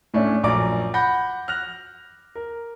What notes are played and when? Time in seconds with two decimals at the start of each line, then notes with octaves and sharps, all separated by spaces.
0.14 A2 A3 C#4 D4
0.44 A#1 F#2 D5 A#5 D6
0.94 F#5 B5 G6 A#6
1.48 F6 F#6 A#6 F7
2.35 A#4